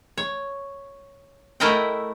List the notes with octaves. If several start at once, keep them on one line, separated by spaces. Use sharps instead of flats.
C#5
A3 E4 A#4 D#5 F#5 G5